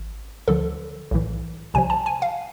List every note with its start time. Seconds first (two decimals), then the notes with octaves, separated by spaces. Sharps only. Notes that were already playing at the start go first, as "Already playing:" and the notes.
Already playing: G#1
0.48 D2 D3 F3 A4
1.11 B1 A2 E3
1.74 C2 C3 F3 G#5
1.90 A5
2.06 G#5
2.22 F5